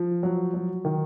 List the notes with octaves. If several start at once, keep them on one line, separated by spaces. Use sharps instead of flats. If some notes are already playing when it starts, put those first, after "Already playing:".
Already playing: F3
F#3
F#3
D#3